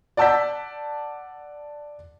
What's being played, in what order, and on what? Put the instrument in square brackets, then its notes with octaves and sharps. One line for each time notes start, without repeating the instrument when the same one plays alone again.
[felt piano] D5 F#5 A5 E6 G6 B6